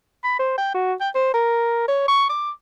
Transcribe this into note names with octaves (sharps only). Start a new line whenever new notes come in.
B5
C5
G5
F#4
G5
C5
A#4
C#5
C#6
D6